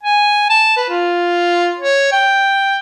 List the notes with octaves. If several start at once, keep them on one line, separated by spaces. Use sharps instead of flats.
G#5
A5
B4
F4
C#5
G5